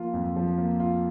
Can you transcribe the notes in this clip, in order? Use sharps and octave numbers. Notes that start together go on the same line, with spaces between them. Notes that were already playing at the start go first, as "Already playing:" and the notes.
Already playing: F3 A#3 F4
F2
F3
A#3
F4